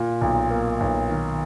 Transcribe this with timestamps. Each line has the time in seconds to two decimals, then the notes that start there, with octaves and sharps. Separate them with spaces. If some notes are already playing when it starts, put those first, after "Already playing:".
Already playing: A#2
0.21 B1
0.50 A#3
0.80 B1
1.09 D#3